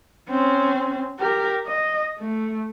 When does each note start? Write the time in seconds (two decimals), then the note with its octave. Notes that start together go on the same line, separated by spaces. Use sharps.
0.29 C4 C#4
1.19 G4 A#4
1.66 D#5
2.19 A3